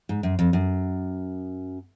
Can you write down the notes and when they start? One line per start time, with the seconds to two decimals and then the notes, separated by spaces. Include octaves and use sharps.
0.09 G#2
0.23 F#2
0.39 F2
0.53 F#2